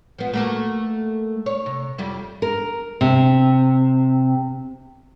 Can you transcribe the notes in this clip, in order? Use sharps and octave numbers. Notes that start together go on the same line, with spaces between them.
F3 B3
A3 A#3 F#4
C#5
C3
F2 G3 E4
A#4
C3